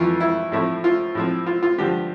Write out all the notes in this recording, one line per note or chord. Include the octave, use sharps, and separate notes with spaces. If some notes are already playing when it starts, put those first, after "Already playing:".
Already playing: F2 E3 A3 F4
E4
A2 F3 A3 C4
F4
A2 F3 C4
F4
F4
G2 D3 F3 G4